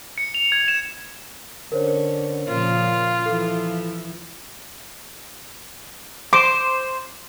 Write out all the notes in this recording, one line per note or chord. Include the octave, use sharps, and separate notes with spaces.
C#7
F7
G#6
E7
D3 C#4 A#4 C5 C#5
A#2 C#3 F3 F4
E3 F3 E4 A4
C5 D6